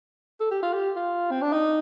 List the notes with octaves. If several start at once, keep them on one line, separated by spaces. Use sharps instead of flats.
A4
G4
F4
G4
F4
C4
D4
D#4